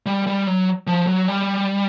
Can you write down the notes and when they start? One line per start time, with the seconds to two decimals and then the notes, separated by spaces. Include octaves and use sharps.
0.06 G3
0.27 G3
0.47 F#3
0.87 F3
1.07 F#3
1.28 G3